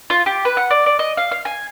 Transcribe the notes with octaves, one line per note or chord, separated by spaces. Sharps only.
F4
G4
B4
F#5
D5
D5
D#5
F5
F5
G#5